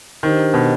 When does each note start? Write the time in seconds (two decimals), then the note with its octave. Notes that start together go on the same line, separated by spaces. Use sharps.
0.23 D#3 D4 G4 C5 D#5
0.54 B2